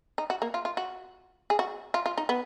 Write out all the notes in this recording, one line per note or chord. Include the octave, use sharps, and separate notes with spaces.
D#4
F#4
A#3
F4
F4
F#4
G#4
F#4
F4
F4
D#4
B3